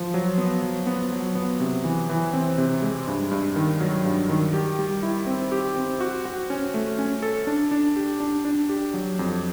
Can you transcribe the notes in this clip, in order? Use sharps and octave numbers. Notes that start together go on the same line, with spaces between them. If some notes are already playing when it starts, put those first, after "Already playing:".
Already playing: F3
F#3
B3
F#3
B3
F#3
B3
C3
E3
E3
C4
C3
G#3
G2
G2
D#3
F#3
G2
D#3
G4
G3
E4
C4
G4
C4
F#4
F#4
C#4
A3
C#4
A4
D4
D4
G4
D4
D4
G4
F#3
F2